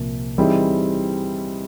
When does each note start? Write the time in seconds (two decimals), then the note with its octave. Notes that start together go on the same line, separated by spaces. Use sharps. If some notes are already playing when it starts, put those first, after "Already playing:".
Already playing: C2 A#2 F3 A#3
0.38 E3 G3 C4 D#4 G#4